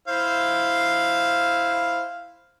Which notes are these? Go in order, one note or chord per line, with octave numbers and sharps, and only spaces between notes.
E4 C5 F5